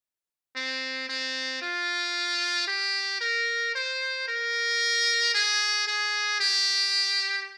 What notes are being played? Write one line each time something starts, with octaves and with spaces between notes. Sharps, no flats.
C4
C4
F4
G4
A#4
C5
A#4
G#4
G#4
G4